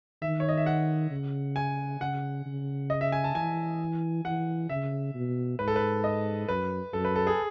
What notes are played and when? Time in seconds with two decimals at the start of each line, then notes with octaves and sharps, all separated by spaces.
0.22 D#3 E5
0.40 C#5
0.49 D#5
0.57 E5
0.66 F#5
1.11 C#3
1.56 G#5
2.01 C#3 F#5
2.45 C#3
2.90 D#5
3.01 E5
3.12 G#5
3.24 A5
3.35 E3 G#5
4.25 E3 F#5
4.69 C#3 E5
5.15 B2
5.59 G#2 B4
5.68 A4
5.76 B4
6.04 D#5
6.48 F#2 B4
6.93 F#2 A4
7.05 B4
7.16 A4
7.27 G#4